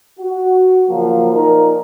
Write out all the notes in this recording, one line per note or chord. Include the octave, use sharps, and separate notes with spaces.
F#4
C#3 F3 F#3 A#3
A#2 F3 D#4 A#4